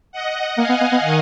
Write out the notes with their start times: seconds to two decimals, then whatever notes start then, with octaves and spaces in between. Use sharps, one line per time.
0.12 D#5 F#5
0.58 A#3 F5 G#5
0.69 B3
0.81 B3
0.92 B3
1.03 D#3